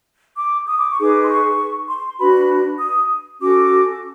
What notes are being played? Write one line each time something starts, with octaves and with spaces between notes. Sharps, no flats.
D6
D#6
D6
C#6
D#4 G#4 B4 D6
C6
C#6
C6
D4 F#4 B4 B5
D#6
C#4 F#4 A4 D6